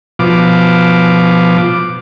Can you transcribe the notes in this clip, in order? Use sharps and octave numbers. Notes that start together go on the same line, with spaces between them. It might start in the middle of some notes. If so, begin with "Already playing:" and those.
B2 F3 D6